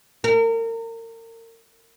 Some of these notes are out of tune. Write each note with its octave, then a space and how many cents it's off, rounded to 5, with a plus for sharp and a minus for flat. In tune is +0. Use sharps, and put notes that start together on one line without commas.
A#4 -35